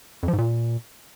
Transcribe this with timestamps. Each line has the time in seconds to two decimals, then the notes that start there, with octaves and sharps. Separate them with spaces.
0.23 F2
0.28 F3
0.33 G#2
0.38 A#2